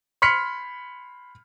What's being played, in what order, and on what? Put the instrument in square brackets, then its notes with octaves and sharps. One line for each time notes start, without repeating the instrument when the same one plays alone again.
[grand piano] B5 C6 F6 B6 C#7